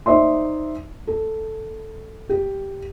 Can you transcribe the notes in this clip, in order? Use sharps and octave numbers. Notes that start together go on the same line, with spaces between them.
D#4 C5 D5 E5 C6
A4
G4